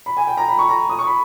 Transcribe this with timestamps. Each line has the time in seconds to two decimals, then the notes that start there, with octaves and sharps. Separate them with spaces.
0.06 B5
0.17 G#5
0.27 G5
0.37 A#5
0.48 B5
0.59 C#6
0.69 A#5
0.89 D#6
0.99 C#6
1.07 B5